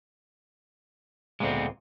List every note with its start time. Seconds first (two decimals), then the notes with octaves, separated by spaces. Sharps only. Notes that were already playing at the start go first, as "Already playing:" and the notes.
1.40 D2 A#2 G#3 B3 C4